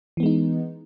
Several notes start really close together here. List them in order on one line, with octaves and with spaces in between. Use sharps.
E3 B3 G#3 D#4